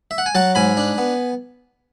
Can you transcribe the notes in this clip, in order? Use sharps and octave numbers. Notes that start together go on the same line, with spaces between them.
E5
F#5
G#5
F#3 F#5 A5
G#2 G#5 B5
D4
B3